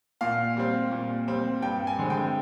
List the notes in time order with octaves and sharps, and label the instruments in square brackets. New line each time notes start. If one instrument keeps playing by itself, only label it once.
[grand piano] A#2 F5
G3 C4
A#2
G3 C4
G2 G5
G#5
D3 G#3 C4
G5